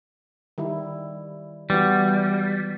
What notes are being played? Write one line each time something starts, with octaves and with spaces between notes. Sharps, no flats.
D#3 G3 E4
E3 G3 B3 F#4